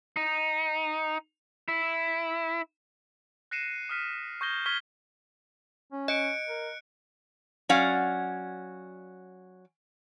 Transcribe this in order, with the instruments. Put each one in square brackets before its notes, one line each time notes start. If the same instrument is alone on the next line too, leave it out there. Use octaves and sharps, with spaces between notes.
[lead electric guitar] D#4
E4
[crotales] F#6 A#6 C7 C#7 D#7 E7
D#6 F6 B6 D#7
C#6 D#6 G6 G#6 A#6 G7
C#6 F6 G6 G#6 B6 G7
[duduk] C#4
[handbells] D#5 [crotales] F#6 C#7 D7
[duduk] A#4
[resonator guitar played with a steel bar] F#3 C#4 D5 F5 F#5